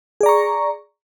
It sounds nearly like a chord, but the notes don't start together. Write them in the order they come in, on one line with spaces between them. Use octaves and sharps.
G#4 D5 A#5 C#6